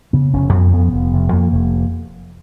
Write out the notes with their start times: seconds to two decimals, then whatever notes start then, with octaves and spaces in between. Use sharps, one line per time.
0.13 C#3 B3
0.33 F1 C#4
0.53 F2 B3
0.72 F2 B3
0.92 F1
1.13 F1
1.32 F2 A#3
1.52 F1